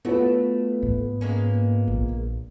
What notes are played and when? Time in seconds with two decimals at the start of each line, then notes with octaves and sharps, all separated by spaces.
0.05 A3 B3 F4 F#4 B4
0.82 G#2
1.21 G#3 A#3 C#4
1.88 A#1